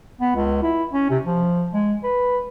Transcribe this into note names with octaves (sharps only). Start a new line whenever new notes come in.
B3
C#2
E4
C#4
C3
F3
G#3
B4